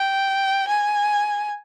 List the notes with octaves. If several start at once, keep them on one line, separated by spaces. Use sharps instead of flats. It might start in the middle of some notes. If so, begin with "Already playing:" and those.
Already playing: G5
G#5